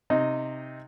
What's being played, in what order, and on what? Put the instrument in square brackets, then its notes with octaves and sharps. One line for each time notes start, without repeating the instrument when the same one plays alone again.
[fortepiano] C3 D#4 D#5